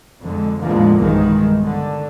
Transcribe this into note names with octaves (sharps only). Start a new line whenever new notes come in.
F2 D3 G#3
E2 A2 D3 F3 G#3 A#3
B1 G2 D#3 E3 G#3
D3